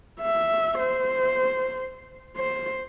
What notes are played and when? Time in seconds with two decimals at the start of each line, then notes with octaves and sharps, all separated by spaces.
0.21 E5
0.80 C5
2.37 C5